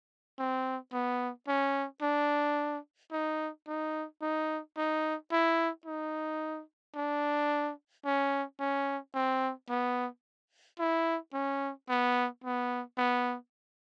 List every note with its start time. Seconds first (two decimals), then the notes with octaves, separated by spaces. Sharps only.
0.39 C4
0.92 B3
1.48 C#4
2.02 D4
3.12 D#4
3.67 D#4
4.22 D#4
4.77 D#4
5.32 E4
5.86 D#4
6.95 D4
8.05 C#4
8.60 C#4
9.14 C4
9.69 B3
10.79 E4
11.33 C#4
11.89 B3
12.44 B3
12.98 B3